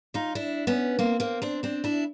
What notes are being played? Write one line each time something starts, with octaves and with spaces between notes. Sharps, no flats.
D#4 F4
D4 E4
B3 C#4
A#3 C4
A#3 C4
C4 D4
C4 D4
D4 E4